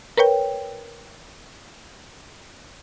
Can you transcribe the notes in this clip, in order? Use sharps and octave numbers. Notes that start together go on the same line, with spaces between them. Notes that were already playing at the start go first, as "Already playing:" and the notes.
A#4 B4 C#5 G5